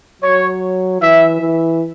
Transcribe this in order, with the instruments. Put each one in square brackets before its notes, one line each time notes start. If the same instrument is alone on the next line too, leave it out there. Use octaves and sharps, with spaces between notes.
[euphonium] F#3 [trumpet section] C#5
[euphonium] E3 [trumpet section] E5
[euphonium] E3